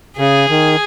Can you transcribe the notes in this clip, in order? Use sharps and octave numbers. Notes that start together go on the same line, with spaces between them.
C#3 G#4
D#3